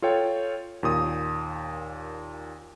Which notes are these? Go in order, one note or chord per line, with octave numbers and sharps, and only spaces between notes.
F4 A4 C#5 G5
D#2 A#2 D#6